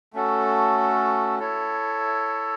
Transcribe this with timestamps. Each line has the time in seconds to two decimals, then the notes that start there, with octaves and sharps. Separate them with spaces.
0.13 A3 C#4 F#4 A4
1.40 E4 A4 C#5